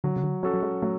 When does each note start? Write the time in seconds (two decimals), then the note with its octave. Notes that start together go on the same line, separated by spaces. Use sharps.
0.04 D3 F#3
0.16 C#3
0.24 D3
0.43 F#3 C#4 F#4 A4
0.54 F#3
0.62 G#3
0.82 F#3 A3